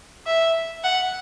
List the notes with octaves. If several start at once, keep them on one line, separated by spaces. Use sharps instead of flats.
E5
F#5